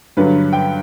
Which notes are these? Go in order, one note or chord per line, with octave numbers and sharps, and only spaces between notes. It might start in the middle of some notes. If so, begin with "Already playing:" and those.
G2 D3 F#3 B4
G5